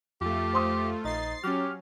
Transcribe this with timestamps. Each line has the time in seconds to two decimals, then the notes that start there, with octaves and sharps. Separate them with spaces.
0.21 F2 A3 F4 G4
0.53 C5 C6 D#6
1.05 A#1 D#4 A6 C7
1.44 F#3 C#4 G4 F6